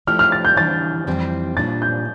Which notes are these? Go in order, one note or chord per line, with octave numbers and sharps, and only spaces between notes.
F3 A3 E4 G4 D5 F6
F6
A6
G6
E3 G3 D4 A6
F2 E3 G3 C4
A#2 G3 D4 A6
G6